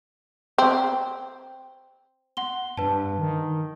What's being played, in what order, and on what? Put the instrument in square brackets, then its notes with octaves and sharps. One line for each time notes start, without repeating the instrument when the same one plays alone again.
[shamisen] C4
[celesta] F#5 C6 G7
[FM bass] G2 [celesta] B4 A5
[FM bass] D#3